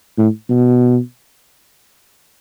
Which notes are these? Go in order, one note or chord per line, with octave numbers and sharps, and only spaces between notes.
A2
B2